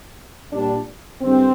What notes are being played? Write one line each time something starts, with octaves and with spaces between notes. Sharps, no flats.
A#2 G3 D4
G2 D3 G#3 C4